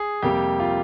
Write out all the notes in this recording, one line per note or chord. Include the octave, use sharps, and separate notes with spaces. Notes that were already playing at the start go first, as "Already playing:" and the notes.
Already playing: G#4
F2 C3 G3 A#3 G4
F4